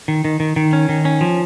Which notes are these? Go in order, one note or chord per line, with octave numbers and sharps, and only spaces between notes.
D#3
D#3
D#3
D#3
C#4
D#3
C#4
F3